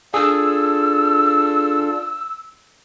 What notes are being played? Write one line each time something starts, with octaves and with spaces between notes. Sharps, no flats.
D4 F4 G#4 A4 E6